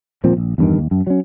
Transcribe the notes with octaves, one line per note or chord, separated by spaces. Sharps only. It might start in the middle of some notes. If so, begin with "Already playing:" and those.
D#1 A#2 F3 C4
A#1
E2 G2 D#3
D#2
F#2
F#3 C#4